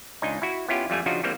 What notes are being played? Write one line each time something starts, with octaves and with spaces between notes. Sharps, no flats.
C#2 D4 D#4 D#5 G#5
E4 F#4
B3 C#4 E4 F4 G4
F2 G3 A3 G#5
C#3 F3 D4 D#4 F4 F#4
E3 G3 A#3 C4